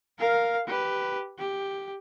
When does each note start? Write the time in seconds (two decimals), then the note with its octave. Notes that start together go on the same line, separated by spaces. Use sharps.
0.18 A#4 F5
0.67 G4 B4
1.38 G4